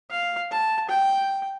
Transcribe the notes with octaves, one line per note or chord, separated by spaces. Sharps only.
F5
A5
G5